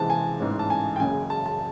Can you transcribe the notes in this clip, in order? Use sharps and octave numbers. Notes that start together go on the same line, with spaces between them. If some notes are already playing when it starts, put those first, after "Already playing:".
Already playing: C#2 C3 E3 G#3 C4 A5
G#5
A1 G#2 E3 G#3 C#4
A5
G#5
G5
F#1 F#2 C#3 G#5
A5
A5